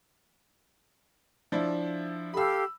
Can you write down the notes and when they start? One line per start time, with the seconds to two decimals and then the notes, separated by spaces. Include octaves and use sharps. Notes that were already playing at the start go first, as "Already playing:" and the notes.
1.52 F3 D4 E4
2.34 G4 A4 F5 B5 E6